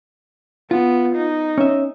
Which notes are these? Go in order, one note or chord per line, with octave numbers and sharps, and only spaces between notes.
B3 F4
D#4
C#4 E5